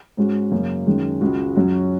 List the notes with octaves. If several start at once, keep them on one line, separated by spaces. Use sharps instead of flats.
G#2 G#3 C#4 F#4
F#2 C#3 A#3
F#2 D#3 G#3
C#2 C#3 G#3 F#4
F#2 F#3 C#4 F#4